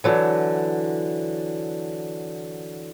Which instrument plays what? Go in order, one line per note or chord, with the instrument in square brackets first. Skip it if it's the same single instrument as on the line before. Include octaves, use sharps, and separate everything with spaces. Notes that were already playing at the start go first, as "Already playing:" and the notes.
[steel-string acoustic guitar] D3 E3 F#3